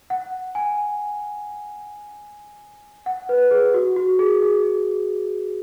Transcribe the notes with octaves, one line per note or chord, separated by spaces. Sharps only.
F#5
G#5
F#5
B4
G#4
F#4
F#4
G#4
G#4